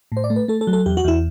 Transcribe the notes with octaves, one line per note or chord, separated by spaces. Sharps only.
A2 C5
D5
A3
B4
A3 A4
A4
F#3
A4
E2 G4
F#4
E2 E4